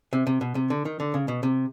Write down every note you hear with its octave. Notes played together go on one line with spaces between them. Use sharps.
C3
C3
B2
C3
D3
D#3
D3
C#3
B2
C3